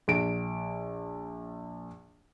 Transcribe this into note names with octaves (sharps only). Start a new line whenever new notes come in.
A#1 D7